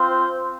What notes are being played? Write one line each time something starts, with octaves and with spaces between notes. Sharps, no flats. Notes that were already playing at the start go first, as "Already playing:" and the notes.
Already playing: C4 F4 C5